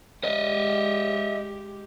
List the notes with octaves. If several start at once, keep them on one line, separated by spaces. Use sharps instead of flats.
G#3 G4 D#5 E5